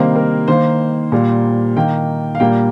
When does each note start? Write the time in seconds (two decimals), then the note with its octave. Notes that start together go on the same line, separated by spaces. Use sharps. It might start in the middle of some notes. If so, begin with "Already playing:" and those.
Already playing: C3 D#3 G3 A#3 C5
0.16 A#4
0.48 D#3 A#3 C5
1.12 A#2 G3 A#3
1.76 D#3 A#3 G5
2.35 F5
2.40 A#2 G3 A#3 G5